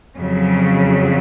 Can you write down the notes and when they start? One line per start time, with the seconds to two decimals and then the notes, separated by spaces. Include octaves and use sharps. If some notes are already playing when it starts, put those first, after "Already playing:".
0.16 F2 C#3 F#3